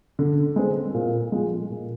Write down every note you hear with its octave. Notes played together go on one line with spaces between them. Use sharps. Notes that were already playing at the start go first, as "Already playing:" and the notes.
D3
G#3 C4
A#2
F3 G#3
A#2